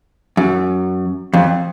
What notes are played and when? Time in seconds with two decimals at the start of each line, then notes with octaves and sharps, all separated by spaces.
0.37 F#2
1.34 F2